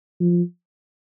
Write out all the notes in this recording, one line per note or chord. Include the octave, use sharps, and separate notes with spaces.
F3